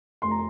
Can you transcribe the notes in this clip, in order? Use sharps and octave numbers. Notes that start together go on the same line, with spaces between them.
F1 C6
A#5